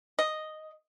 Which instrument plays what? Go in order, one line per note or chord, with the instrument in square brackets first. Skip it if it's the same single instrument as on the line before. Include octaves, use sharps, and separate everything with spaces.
[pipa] D#5